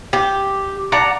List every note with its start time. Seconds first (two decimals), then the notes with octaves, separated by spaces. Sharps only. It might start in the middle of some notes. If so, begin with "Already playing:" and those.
0.13 G4
0.92 D4 F#5 A#5